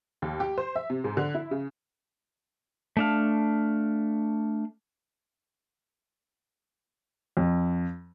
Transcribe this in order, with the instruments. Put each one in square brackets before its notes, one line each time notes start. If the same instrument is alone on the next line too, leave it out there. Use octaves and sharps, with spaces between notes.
[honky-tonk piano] D#2
G4
C5
E5
C3
G#2
D3
E4
C#3
[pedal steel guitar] A3 D4 F5
[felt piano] F2